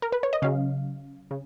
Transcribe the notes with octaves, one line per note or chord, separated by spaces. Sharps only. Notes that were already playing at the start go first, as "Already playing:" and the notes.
A#4
B4
C#5
D#5
C#3 F#3 C#4 F5
C#3